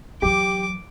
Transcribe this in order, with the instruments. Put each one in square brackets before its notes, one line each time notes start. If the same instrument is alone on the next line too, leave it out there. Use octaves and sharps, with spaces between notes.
[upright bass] E3 F#3 [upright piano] G4 [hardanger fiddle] D6